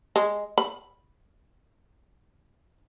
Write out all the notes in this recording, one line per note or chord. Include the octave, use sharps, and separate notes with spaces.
G#3
B5